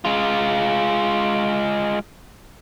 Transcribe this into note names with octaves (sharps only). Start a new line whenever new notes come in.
G#3 F4